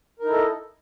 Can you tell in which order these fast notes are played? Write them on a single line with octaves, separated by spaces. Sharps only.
A#4 D#4 E4 A4 D#5